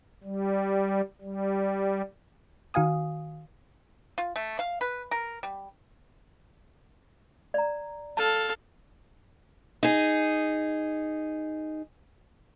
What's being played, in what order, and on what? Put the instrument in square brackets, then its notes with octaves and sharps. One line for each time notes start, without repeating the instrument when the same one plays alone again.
[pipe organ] G3
G3
[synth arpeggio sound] D#3 F#4 F5 G#5 D#6
[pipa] F4
A3
F5
B4
A#4
G3
[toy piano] D5 A#5
[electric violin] A4 F5 [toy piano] A5
[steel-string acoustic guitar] D#4 G#4